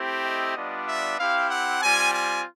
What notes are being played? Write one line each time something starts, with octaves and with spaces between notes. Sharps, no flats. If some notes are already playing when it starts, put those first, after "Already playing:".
Already playing: A3 C4 E4 G4
D#5
G3 B3 D4 F4
E5
C4 E4 G4 F5
F#5
G3 C4 F4 G#5
G#5